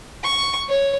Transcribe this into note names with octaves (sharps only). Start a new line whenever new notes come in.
C#6
C#5